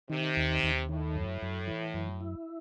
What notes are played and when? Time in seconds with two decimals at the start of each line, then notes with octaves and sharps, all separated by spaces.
0.10 C3 D#3
0.37 D#2
0.63 D#2
0.89 A2 D#3
1.15 F#2
1.42 F#2
1.67 E3
1.94 F#2
2.20 E4